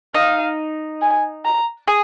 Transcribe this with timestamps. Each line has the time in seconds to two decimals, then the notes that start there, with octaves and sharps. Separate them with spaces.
0.14 D#4 F5
1.02 G#5
1.45 A#5
1.88 G#4